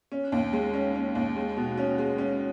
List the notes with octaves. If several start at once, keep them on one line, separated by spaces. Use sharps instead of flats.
C#4
D#2
G#3
C#4
C#4
D#2
G#3
B2
C#4
G#3
C#4